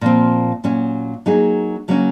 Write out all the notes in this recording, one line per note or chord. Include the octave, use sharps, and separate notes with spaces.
A#2 F3 C4
A#2 F#3 C#4
F#3 A#3 D#4 G#4
C#3 F#3 A#3 C#4